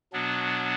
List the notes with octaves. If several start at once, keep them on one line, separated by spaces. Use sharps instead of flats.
B2 F#3 B3 D4